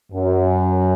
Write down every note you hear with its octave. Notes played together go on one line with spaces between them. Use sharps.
F#2